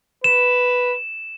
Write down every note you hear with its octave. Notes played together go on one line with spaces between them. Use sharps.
B4 E7